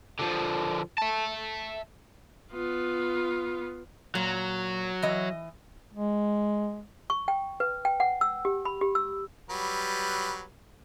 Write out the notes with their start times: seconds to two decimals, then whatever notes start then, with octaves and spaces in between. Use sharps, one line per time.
0.19 D3 F3
0.98 E5 A5
2.52 B3 F4
4.15 A#2 F#3
5.02 E3 D#5
5.93 G#3
7.10 C#6
7.28 G5
7.60 B4
7.85 G5
8.00 F#5
8.21 E6
8.45 G4
8.65 B5
8.81 G4
8.95 E6
9.50 F#3 G3 B4